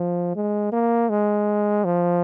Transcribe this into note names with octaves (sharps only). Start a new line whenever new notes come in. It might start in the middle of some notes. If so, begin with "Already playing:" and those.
Already playing: F3
G#3
A#3
G#3
F3